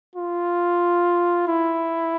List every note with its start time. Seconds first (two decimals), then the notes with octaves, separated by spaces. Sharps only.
0.16 F4
1.48 E4